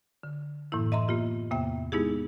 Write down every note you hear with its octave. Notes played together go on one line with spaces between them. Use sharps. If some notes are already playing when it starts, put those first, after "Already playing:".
D3
F#2 A2 E3 A#3 E4
D#5 E5 A#5 C6
A#3 B3 F4 G4
E2 C3 A#3 B3 E5 G5
G#3 B3 D#4 E4 G4 G#4